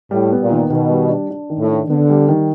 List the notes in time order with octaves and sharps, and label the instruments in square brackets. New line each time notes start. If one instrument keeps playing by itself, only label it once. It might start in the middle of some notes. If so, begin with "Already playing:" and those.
[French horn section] A2 [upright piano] G3
[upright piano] B3
[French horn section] A#2
[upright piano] D#3
[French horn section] B2 [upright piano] D#3
[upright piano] G3
D4
D4
D#3
[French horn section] A2
[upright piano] D4
[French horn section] D3 [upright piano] B3
[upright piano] G3
D#3